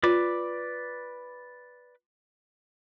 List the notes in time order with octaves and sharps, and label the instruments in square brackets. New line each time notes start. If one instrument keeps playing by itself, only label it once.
[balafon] F4 [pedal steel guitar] B4 D5 D6